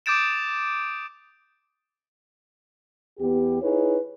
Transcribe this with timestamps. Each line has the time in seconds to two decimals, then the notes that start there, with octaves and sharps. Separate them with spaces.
0.06 D6 D#6 G6 A6 D7 E7
3.19 E2 B3 G4
3.62 D#4 E4 G#4 B4 C#5